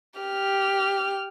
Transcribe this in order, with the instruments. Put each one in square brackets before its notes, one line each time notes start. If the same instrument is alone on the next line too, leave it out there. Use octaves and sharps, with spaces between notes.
[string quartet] G4 F6